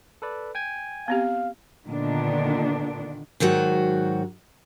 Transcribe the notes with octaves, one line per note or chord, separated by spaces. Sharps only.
A4 B4 D5
G5 G#5 G#6
B3 C4 G4 F5
A#2 D3 D#3 B3 D4
G#2 D#3 F#3 F#4